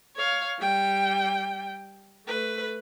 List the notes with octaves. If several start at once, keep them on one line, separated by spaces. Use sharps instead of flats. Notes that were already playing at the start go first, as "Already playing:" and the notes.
C#5 F5
G3 G5
A3 B4